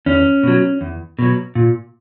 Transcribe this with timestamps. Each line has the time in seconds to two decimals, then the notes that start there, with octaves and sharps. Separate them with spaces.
0.06 E2 C#4
0.43 B2 F#3
0.81 E2
1.19 B2 F#3
1.55 A#2